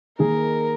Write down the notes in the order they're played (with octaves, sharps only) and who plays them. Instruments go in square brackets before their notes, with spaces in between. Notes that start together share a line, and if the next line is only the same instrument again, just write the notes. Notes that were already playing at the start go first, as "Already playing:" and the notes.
[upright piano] D#3 A#3 D#4 G#4 [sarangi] A#4